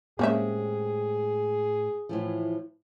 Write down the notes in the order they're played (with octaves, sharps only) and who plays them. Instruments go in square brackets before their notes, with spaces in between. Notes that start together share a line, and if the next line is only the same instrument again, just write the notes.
[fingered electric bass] A2 [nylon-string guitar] G#3 C4 G4 [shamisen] A#3 C#4 E5 [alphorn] G#4
[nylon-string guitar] A2 E3 F3